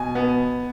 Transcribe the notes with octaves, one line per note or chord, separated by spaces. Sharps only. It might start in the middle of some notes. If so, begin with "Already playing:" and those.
Already playing: B2 G#5
B3